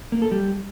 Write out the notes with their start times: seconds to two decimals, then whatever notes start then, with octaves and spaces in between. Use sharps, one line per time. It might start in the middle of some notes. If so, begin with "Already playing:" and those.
0.12 A#3
0.22 A4
0.31 G3